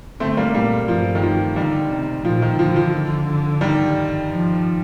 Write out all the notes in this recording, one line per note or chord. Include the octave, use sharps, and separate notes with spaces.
D3 A3 C4
G3 A#3
A#2 G3 A#3
G2 F3
D#3
F3
D3 D#3 G3
C3
A#2 F3
D#3
D3 F3
F3
D#3 G3
F3